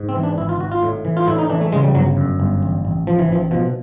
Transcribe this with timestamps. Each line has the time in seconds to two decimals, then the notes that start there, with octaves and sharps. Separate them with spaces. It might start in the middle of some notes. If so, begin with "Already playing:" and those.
Already playing: G#2
0.09 C4
0.15 E3
0.23 D4
0.38 G#1 E4
0.49 F4
0.60 G#1 F#4
0.72 F4
0.83 A2
1.05 E3
1.17 F4
1.27 A2 E4
1.39 D#4
1.50 E3 D4
1.61 A3
1.72 C#3 G#3
1.84 G3
1.94 G1 F#3
2.17 F#2
2.40 G1
2.63 A1
2.85 A1
3.07 A1 F3
3.19 E3
3.29 A1 F3
3.51 B2 F3